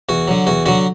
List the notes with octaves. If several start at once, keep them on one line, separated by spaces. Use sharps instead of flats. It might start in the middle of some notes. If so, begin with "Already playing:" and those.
E2 F#4
D3 F#3
E2 F#4
D3 F#3 F#4